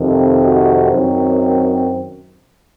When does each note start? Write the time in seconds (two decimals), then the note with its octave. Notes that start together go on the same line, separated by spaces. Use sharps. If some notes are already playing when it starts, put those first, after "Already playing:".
Already playing: F2 C3 D#3
0.42 F#4
0.92 F#2 D#3 F#3 C4